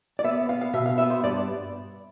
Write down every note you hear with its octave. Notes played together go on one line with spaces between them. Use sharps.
D5
B3 E5
B3 F5
F5
B2 E5
F5
B3 E5
C5
G2 D5